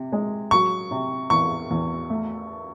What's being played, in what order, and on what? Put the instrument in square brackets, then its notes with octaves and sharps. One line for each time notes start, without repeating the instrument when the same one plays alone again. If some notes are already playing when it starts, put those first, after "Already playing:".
Already playing: [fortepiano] C3
G#3
[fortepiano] F#3 [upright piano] C#6
[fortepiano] C3
[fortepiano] E2 [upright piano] C#6
[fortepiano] E2
A3